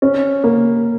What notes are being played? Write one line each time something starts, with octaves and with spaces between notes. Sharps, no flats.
C#4
A#3